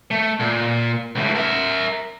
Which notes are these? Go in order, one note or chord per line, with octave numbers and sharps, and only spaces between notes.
A3
A#2
C#2 A2
A#4 E5